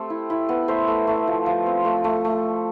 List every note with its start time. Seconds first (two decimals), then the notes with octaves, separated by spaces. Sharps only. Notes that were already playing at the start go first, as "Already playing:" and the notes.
Already playing: A3 C4 G4 A4 C5
0.10 E4
0.30 E4
0.49 B3
0.68 A3 C5 E5
0.87 A3
1.07 A3
1.27 F3
1.46 F3
1.66 C4
1.85 A3
2.04 A3
2.25 A3